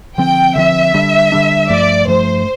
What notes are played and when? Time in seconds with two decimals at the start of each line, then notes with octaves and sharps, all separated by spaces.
0.18 D3 F3 C4 G5
0.55 D3 F3 C4 E5
0.94 D3 G3 D4
1.32 D3 G3 D4
1.69 G2 F3 A3 D5
2.07 G2 F3 A3 C5